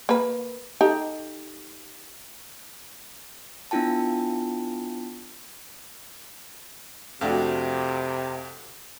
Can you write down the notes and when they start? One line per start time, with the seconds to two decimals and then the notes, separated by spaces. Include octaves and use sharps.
0.09 A#3 B4
0.81 D#4 G4 A4
3.71 B3 D4 E4 F4 G5 A5
7.21 F2 C3 A3 D4 F#4 F5 G5